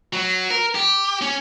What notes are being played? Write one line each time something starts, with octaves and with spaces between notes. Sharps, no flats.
F#3
A#4
G4
C#4